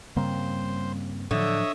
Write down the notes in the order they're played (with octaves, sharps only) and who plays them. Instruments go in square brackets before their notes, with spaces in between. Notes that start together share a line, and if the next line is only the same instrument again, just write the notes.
[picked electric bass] G2 A#3 C4 [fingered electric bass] C#3 G3 [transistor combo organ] C5
[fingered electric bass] A2 F3 F#3 [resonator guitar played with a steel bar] D3 [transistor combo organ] C#5 D#5 E5